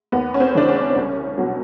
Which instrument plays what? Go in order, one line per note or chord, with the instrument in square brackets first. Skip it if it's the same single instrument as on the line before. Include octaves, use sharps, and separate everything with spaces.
[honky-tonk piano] D#2 B3
C#4
C4
C#3 E3 D4
C#4
C2
B2 F#3